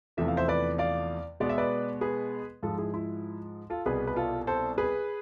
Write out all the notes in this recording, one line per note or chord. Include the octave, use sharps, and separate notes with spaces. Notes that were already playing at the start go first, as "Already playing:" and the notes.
E2 C3 F3 A3 E5
F5
C5 E5
B4 D5
D5 F5
B2 G#3 B3 D5
E5
B4 D5
G#4 B4
G#2 F3 G#3 F4 A4
E4 G#4
E4
F4 A4
C2 B2 B3 G#4 B4
B4
F4 A4
A4 C5
G#4 B4